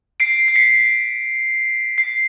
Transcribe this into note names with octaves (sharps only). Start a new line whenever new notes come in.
C7 D7
C7
B6 C#7
C7